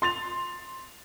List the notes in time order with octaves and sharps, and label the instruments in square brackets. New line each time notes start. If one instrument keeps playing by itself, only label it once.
[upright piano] C6 A6 F7